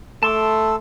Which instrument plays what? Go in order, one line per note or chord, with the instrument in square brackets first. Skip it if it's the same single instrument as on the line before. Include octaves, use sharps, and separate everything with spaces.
[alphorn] A3 [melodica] A4 [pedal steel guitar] A5 C6 D6